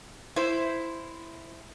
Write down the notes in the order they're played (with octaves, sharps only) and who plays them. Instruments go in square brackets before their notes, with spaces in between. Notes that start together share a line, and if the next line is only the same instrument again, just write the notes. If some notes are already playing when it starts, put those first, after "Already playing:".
[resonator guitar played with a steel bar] E4 C5